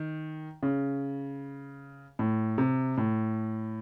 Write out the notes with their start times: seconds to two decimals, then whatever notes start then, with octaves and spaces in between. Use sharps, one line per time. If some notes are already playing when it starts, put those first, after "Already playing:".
Already playing: D#3
0.63 C#3
2.19 A2
2.58 C3
2.97 A2